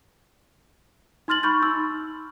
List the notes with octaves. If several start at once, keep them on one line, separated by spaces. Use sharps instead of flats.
D#4 C6 F6 A6 F#7
B5 C#6 G6 A6
D#4 E6